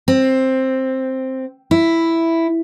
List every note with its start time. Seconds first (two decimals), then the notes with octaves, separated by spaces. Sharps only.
0.08 C4
1.71 E4